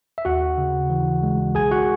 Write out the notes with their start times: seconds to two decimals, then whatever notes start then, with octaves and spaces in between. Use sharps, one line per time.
0.18 E5
0.25 D#2 F#4 F#5
0.58 C#3
0.90 E3
1.23 G#3
1.55 B1 G#4 G#5
1.71 F#4 F#5